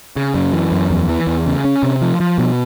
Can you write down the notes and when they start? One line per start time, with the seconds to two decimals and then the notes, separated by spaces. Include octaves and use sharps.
0.16 C#3
0.35 F#2
0.53 E3
0.72 F#2
0.90 E2
1.09 E3
1.27 E2
1.46 C#3
1.65 C#4
1.83 C3
2.01 F3
2.20 F3
2.38 B2